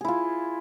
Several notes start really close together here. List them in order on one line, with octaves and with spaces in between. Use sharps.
G#4 E4 F4